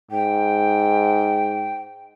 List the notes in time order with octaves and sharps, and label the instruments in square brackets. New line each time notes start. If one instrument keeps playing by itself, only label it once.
[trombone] G#2 [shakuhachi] G5